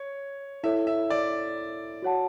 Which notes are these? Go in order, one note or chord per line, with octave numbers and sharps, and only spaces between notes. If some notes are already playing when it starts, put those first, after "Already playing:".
Already playing: C#5
E4 A4 C#5 E5
E5
D5
F#4 C#5 F#5 A5